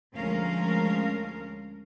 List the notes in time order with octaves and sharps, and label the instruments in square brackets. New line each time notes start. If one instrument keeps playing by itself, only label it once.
[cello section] D2 F3 G#3 C#4 A#4 F5